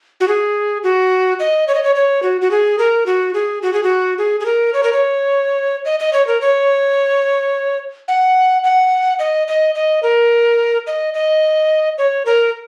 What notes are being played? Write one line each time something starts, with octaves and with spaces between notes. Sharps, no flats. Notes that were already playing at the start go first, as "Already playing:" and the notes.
F#4
G#4
F#4
D#5
C#5
D#5
C#5
C#5
F#4
F#4
G#4
A#4
F#4
G#4
F#4
G#4
F#4
G#4
G#4
A#4
C#5
A#4
C#5
D#5
D#5
C#5
A#4
C#5
F#5
F#5
D#5
D#5
D#5
A#4
D#5
D#5
C#5
A#4